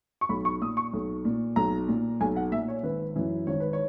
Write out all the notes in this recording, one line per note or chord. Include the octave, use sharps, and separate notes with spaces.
C#6
B1 B5
C#6
A#2 D#6
C#6
B1
A#2
B1 A#5
A#2
B1 G#5
F#5
A#2 E5
C#5
G#1 B4
F#2 E3
G#1 C#5
B4
C#5